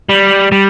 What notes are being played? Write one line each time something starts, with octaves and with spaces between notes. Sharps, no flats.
G3
G3